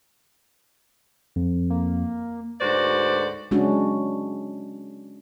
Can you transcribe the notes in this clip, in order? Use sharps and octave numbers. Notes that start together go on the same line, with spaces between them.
F2
A#3
D2 G#2 F#4 B4 C5 D5
G#3 C#4 D4 F#4